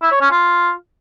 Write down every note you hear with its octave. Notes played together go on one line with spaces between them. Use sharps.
E4
C#5
C#4
F4